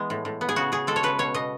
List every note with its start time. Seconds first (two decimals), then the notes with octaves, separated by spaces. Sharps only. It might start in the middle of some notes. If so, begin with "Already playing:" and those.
Already playing: E3 G#3 B3
0.10 A2
0.25 A2
0.41 B3
0.49 G#4
0.56 C#3 F#4
0.72 C#3 G#4
0.87 G#3 A4
0.96 C#5
1.03 C#3 B4
1.19 B2 C#5
1.34 B2 D#5